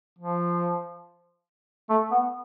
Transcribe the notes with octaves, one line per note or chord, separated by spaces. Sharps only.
F3
A3
B3